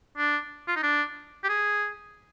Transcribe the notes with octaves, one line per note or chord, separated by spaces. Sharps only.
D4
F4
D#4
D4
G4
G#4